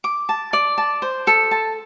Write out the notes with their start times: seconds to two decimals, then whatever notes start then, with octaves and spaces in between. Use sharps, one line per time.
0.04 D6
0.29 A5
0.53 D5
0.78 A5
1.02 C5
1.27 A4
1.51 A5